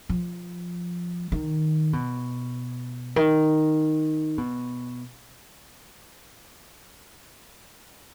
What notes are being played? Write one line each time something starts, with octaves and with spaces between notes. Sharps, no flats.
F3
D#3
B2
D#3
B2